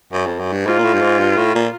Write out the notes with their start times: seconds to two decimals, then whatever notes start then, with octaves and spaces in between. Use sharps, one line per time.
0.13 F#2
0.26 F2
0.40 F#2
0.53 G2
0.66 G#2 F4
0.79 A#2
0.84 A2
0.94 G2
1.01 G#2
1.19 G2
1.37 A2
1.55 A#2